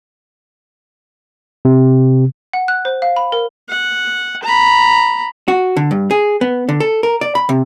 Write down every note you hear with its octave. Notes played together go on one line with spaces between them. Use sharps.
C3
F#5
F#6
C5
F5
B5
A#4
F#5
A#5 B5
F#4
D3
G2
G#4
B3
D3
A4
A#4
D5
B5
C3